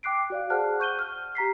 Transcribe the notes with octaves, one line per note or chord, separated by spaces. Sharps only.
G5 D6 F#6 C7 D7
F#4 D5 F5
G#4 C5 F#5 A5 F6 F#6
C#6 G6 D#7 G7
F6
G4 A#5 B6 C7